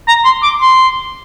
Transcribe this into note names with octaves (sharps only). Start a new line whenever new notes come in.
A#5
C6
D6
C6